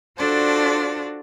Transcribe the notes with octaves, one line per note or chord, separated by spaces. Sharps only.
D4 F4 F#4 A4 C5 D5